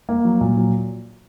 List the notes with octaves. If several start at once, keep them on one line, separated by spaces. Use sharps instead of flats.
A#3
F#3
A#2
F#3